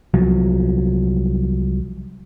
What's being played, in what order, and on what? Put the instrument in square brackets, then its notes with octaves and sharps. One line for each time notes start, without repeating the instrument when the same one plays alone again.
[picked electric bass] C2 F3 F#3